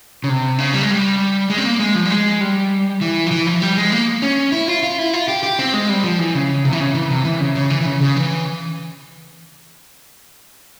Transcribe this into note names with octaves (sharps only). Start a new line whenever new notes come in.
C#3
C3
C#3
G3
G#3
G3
G#3
C4
A#3
G#3
F3
G3
G#3
G3
E3
F3
E3
F3
G3
G#3
A#3
C#4
E4
F4
F4
E4
F4
G4
G4
C4
G#3
G3
F3
E3
C#3
C3
E3
C#3
E3
C3
E3
C#3
C#3
E3
E3
C#3
C#3
E3